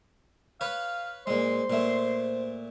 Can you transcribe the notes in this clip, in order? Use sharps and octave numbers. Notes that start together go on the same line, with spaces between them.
B4 C#5 F5
A#2 G#3 C5 C6
A#2 A3